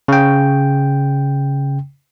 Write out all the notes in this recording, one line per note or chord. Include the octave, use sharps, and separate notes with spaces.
C#3 G5